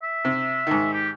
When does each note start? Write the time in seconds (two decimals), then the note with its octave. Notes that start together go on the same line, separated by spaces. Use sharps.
0.03 E5
0.25 C3
0.67 G#2 D#3
0.93 G4